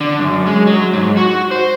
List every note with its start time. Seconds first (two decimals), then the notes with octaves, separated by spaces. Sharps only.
0.01 D3
0.19 F#2
0.46 G#3
0.67 F#3
0.93 G#2
1.17 F#4
1.51 C5